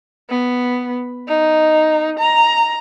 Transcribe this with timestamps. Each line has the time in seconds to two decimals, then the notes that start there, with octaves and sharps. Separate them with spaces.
0.30 B3
1.28 D#4
2.19 A#5